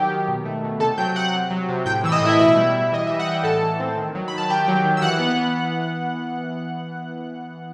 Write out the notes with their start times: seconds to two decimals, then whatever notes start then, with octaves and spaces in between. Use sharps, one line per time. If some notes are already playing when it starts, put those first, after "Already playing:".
Already playing: D#3 F#3 G4 G5
0.11 D#3
0.28 B2
0.45 A3
0.64 B2
0.80 C3 A4 A5
0.98 F#3 G5 G6
1.16 C3 F#5 F#6
1.34 C3
1.51 F#3
1.69 C3
1.86 A2 G5 G6
2.04 E3 E6
2.12 D#5 D#6
2.21 A2 E4 E5
2.39 B2 E4 E5
2.56 G3
2.73 B2
2.92 E3 D#5
3.07 G3 E5
3.20 F#5
3.27 E3 G5
3.44 A2 A4 A5
3.62 E3
3.80 C4
3.97 D#3
4.15 F#3
4.28 D#3 B5
4.38 A5
4.49 D#3 G4 G5
4.68 F#3
4.85 D#3
4.97 E6
5.02 E3 F#5 F#6
5.19 B3
5.37 B3